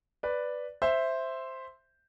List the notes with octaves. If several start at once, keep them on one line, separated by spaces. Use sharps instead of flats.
B4 D5
C5 E5